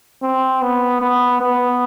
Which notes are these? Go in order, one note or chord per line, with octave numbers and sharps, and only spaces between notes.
C4
B3
B3
B3